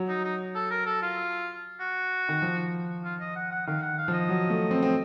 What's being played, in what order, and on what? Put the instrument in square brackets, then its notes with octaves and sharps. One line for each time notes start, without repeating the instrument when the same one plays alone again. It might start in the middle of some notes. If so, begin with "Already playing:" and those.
Already playing: [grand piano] F#3
[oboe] D#4
D#4
A4
A#4
A4
F4
F#4
[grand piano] D#3
F3
[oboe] F4
D#5
F#5
F#5
[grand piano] D#3 [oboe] F5
[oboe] F#5
F5
[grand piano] F3
[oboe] D#5
[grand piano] F#3
A3
C4
C4